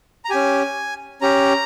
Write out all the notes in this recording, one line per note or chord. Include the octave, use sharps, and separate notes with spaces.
A#5
C#4 G4 G#5
C#4 G4 A#5